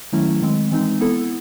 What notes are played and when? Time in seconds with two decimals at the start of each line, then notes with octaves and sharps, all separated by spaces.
0.13 D#3 F#3 A3 C#4 E4
0.42 D#3 G#3 C4
0.72 E3 G#3 C4 D#4
1.01 B3 E4 A4